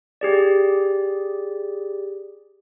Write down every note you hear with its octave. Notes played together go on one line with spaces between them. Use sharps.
G4 G#4 D5